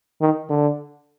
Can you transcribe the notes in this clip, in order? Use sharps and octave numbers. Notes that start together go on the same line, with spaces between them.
D#3
D3